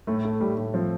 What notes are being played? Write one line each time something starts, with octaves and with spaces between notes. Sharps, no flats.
A2 A3
A3
A2 G3
A2
F3 C4